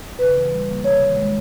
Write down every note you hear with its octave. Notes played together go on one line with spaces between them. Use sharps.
C#3 B4
E3
G3
A#3
C3 C#5
D#3
G#3